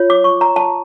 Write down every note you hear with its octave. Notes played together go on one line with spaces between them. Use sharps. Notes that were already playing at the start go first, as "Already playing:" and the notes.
Already playing: F4 C#5
D6
C#6
A#5
A5